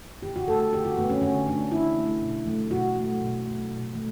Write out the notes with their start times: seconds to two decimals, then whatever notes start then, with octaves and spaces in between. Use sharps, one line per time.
0.23 D3 G4
0.36 F#4
0.48 A3 A4
0.60 A4
0.72 D3 G4
0.85 F#4
0.97 A3 B3
1.10 C#4
1.22 D3 C#4
1.46 A3 D4
1.72 D3 E4
1.97 A3
2.21 B2
2.46 F#3 A3
2.71 B2 F#4
2.96 F#3 A3
3.21 B2
3.45 F#3 A3
3.71 B2
3.95 F#3 A3